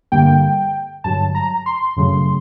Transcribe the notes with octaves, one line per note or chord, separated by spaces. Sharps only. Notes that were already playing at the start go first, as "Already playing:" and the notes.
G2 D3 G3 A#3 G5
G2 D3 F#3 A5
A#5
C6
F#2 C#3 F#3 A3